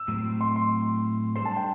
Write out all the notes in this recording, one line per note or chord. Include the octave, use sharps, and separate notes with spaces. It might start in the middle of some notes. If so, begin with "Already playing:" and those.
Already playing: E6
A2 F#3 A3 C4
C6
C6
G3 D4 A4 C5 C6
A5
G5